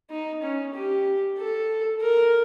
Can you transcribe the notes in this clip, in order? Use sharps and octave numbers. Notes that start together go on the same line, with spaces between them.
D#4
C#4
G4
A4
A#4